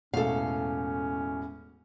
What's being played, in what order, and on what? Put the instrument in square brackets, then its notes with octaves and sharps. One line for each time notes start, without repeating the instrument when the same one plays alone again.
[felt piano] E1 A2 [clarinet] C#4 [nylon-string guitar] A4 F5